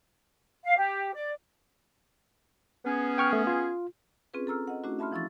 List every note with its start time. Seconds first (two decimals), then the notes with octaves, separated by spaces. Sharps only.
0.64 F5
0.77 G4
1.14 D5
2.85 B3 C#4 G#4
3.18 G5 C#6 F6
3.33 A3
3.47 F4
4.34 C4 C#4 F4 G#4 B4
4.47 A4 A#5 E6 F6
4.68 D#5 F#5
4.84 A3 C#4 D4 E4 F#4
4.99 E5 A5 B5 C6 F6
5.12 E3 F3 E4 C#6 A6